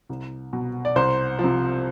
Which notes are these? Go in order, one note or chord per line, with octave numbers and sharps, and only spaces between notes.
C2
B2
D5
C2 C5
C3 F3